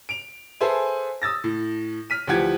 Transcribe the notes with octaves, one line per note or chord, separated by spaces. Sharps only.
D7 F7
G#4 A4 B4 C5 E5 G#5
D#6 E6 A6 A#6
A2
F6 B6 D#7
D2 E3 F3 G4 F#5 G#6